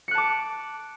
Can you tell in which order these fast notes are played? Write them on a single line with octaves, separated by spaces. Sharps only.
C#7 F#6 A5 D6